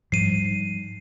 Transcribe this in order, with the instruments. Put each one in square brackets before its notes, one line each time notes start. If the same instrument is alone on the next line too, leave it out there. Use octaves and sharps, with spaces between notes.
[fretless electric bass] G#2 F3 G3 [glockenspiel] C7 D#7